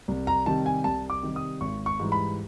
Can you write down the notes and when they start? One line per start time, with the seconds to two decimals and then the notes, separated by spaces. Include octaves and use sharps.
0.08 C2
0.27 A#5
0.46 C3 D#3 G3 A5
0.66 G#5
0.84 C2 A5
1.10 D6
1.23 C3 D#3 G3
1.36 D#6
1.61 G#1 C#6
1.86 C#6
2.00 G#2 E3 G3
2.12 B5